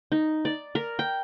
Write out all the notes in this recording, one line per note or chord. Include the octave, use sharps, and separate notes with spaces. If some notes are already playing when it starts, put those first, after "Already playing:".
D#4
D5
A#4
G5